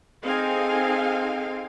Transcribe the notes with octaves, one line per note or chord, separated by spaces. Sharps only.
C4 D#4 G#4 A4 F5 G#5